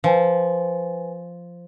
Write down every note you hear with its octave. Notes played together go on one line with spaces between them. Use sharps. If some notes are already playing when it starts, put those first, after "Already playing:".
F3 B4 G#5